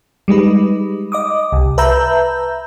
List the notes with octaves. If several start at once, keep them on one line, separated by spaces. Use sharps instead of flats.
G3 G#3 D#4 B4
D#5 D6 D#6
C2
B4 E5 A5 A#5 E6 G6